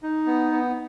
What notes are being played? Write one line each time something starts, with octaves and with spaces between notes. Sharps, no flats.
D#4
B3
B3